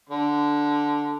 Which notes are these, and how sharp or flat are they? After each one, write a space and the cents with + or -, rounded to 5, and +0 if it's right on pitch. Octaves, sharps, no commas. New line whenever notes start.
D3 -5